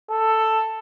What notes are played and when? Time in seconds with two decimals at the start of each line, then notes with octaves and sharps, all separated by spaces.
0.10 A4